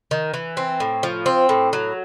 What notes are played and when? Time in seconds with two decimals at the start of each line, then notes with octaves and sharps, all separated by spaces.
0.11 D#3
0.34 E3
0.57 C4
0.80 A2
1.03 F3
1.26 C4
1.49 A2
1.73 F#3